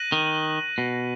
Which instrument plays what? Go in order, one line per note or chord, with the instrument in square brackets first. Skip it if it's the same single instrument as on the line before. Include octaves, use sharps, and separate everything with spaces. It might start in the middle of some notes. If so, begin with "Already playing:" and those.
Already playing: [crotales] F#6 A#6 D#7 F#7
[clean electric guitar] D#3
B2